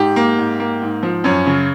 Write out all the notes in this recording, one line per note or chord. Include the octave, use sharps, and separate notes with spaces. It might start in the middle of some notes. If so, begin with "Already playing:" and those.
Already playing: G#2 G4
A#3
G#2
A#3
G#2
F3
F#2 C#4
C#3